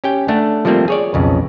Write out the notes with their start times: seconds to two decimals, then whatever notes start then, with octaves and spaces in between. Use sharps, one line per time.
0.04 C#4 G4 G5
0.28 A3 D4 F#5
0.65 F3 G3 A3 A#3 C4
0.88 G#4 C#5 D5
1.14 B1 F2 C#3